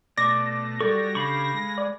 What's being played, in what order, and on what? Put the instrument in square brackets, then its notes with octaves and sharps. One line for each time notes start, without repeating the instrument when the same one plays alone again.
[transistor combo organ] B2 A3 [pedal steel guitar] D5 [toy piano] D6 [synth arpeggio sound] A#6
[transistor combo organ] F#3 G3 [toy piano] A4 [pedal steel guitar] D5 C#6
[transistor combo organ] C#3 D4 G4 [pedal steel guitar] F5 B5 C#6
[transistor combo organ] G#3
[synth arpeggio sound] D5